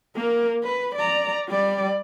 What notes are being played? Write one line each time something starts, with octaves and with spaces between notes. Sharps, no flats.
A#3 A#4
B4
D5 A#5
G3 D5